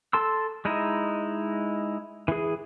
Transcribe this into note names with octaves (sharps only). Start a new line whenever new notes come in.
A4 A5 C6 E6
G#3 D#4 E4 D#5
E3 G#4